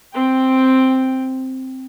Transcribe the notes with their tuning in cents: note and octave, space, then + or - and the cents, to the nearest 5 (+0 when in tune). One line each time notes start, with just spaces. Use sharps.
C4 +0 G5 +5